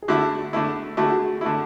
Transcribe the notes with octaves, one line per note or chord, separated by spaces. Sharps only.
G#4
D3 A3 E4 F#4
D3 A3 E4
D3 A3 E4 F#4
G#4
F#4
D3 A3 E4